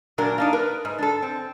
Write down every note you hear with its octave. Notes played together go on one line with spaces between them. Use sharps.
A#2 F#3 D4 A#4
A#3 D4 D#4
A#4 B4
G#2
D4 A4
C4